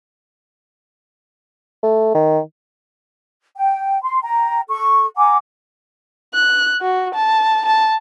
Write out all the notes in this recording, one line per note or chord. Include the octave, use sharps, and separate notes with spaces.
A3
D#3
G5
C6
G5 A#5
A4 C#6
F#5 G#5 A#5 D6
F#6
F#4
A5
A5